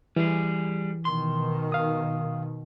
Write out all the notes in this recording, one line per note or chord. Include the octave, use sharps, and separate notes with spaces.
E3 G3 G#4
B2 D#3 C6
F5 D#6